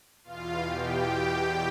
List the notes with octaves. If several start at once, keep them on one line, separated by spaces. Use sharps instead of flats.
E2 B2 F4 F5
G4 G5